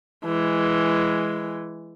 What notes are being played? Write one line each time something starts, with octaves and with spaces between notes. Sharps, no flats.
E3 G#3